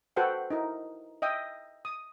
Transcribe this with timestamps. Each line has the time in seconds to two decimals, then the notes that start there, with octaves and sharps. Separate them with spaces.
0.16 F#4 A4 B4 C5 F#5 G5
0.50 D#4 E4 A#4
1.22 D#5 E5 G5 D#6
1.85 D#6